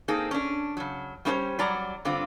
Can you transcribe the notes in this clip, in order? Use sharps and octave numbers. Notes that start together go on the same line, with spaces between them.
A#3 C4 D#4 G#4 A4
C#4 D4
C#3 F#3
G3 C#4 E4 G#4 C5 C#5
F#3 G3 D5 A#5
G2 D3 C4 F4